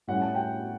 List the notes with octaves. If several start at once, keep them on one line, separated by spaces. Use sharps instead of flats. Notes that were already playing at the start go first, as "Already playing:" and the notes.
A2 G3 C#4 F#5
A5
G5